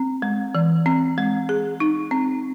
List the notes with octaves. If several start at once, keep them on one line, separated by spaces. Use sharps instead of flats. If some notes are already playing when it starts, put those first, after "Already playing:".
Already playing: C4
G#3
E3
C4
G#3
G#4
D#4
C4